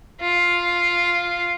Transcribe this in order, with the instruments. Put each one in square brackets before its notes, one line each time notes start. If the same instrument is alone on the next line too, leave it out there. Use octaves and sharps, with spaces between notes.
[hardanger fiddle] F4